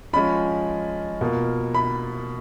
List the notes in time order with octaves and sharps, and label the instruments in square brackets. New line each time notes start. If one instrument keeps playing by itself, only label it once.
[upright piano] F3 G#3 C#4 F4 B5
B2 A#3 F4
B5